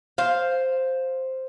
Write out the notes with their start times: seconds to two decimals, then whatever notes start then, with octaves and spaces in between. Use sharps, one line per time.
0.18 C5 F5